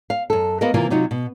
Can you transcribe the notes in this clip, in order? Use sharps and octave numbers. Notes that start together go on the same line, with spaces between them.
F5
F#2 A4
A#3 B3 F#4 A#4 D#5
C3 E3 A#3 C4 F4
C3 F#3 D#4 F4 F#4
B2